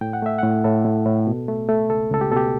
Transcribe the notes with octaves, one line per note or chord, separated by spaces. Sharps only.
A2 G5
F#5
A3 E5
A2 F#5
A2 A4
A2
A2
B2
A3
A3
C#2 A4
C#2 A4
G4
B2 A4
G4